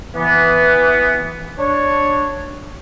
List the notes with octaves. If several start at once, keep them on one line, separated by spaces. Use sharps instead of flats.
E3 B3
D4 C#5